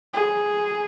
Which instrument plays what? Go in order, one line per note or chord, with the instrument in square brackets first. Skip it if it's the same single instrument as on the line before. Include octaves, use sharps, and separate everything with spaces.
[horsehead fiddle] G#4